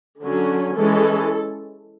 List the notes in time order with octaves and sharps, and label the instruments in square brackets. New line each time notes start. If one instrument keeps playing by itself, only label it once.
[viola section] D3 F#3 C#4
E3 G#3 C#4 A4